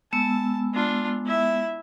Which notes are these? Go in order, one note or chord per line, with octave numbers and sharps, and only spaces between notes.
G#3 B3 A5 E6
D4 F4
E4 E5